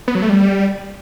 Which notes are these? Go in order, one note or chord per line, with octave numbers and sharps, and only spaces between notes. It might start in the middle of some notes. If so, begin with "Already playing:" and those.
B3
F#3
A3
G3